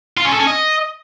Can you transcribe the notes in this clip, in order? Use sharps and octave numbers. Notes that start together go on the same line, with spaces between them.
F4
C#4
A4
C#4
D#5